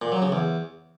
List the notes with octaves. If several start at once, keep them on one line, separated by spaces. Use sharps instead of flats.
A#2
F#3
C#3
E2